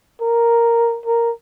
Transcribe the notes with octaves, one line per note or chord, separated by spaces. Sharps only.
A#4
A#4